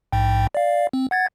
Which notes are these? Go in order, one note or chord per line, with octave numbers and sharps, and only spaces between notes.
A#1 G#2 G5
D5 F5
C4
F#5 G#6 A6